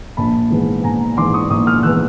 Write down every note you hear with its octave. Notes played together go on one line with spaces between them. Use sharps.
A#1 A5 B5
G#2 E3 G#3 B3
A#1 G#5 A#5
G#2 E3 G#3 B3 C6 D6
C#6 D#6
A#1 C#6 D#6
D#6 F6
E3 G#3 B3 E6 F#6